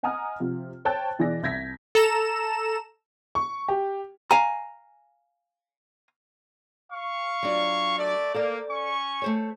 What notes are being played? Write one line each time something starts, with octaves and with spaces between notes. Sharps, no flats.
D#5 F#5 G#5 A#5 D#6 F6
C3 F3
C5 C#5 G5 A5 F#6 A6
B2 E3 G#4 D5 A#6
C2 G6 G#6 A#6 B6
A4 A#5 E7
C#6
G4
F5 G#5 A#5
F5 C#6
F#3 D4 F4
A3 D5
A#3 A4 C5 D5
C#4 C#6
A3 C5 C#5